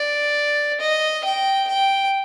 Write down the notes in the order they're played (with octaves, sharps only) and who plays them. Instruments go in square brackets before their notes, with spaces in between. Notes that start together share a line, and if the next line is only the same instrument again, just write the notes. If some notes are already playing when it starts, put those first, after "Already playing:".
Already playing: [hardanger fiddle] D5
D#5
G5
G5